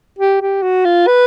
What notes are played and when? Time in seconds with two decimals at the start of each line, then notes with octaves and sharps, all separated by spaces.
0.19 G4
0.41 G4
0.62 F#4
0.85 F4
1.07 B4